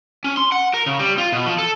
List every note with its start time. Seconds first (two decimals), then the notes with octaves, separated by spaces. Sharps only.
0.24 C#4
0.37 C6
0.52 F#5
0.74 A#4
0.86 C#3
0.99 G3
1.18 F4
1.32 B2
1.46 F3
1.58 A4